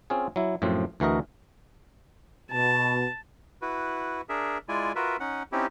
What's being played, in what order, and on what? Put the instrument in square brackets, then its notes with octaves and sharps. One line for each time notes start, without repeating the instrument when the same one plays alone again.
[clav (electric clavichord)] C4 C#4 F4 G#4
F#3 E4
F#2 A2 F3 C4
D2 E3 F#4 A#4 D#5
[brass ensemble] B2 [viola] A5
[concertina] E4 F#4 B4
D4 G#4 A#4 E5
G#3 E4 F4 D5 G#5
F4 F#4 A#4 B4 E5
C#4 D#4 F#5
C4 C#4 D#4 E4 G4